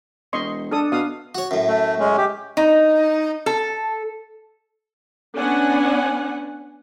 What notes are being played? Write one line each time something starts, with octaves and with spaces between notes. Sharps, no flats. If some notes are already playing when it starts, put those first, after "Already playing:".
E1 D#5 C6 C#6
D4 A4 D#6
B2 F5 D#6
F#4 C#5
F#2 A2
A3
G#3 C#4
G4
D#4
A4
B3 C#4 D4 F#5 G#5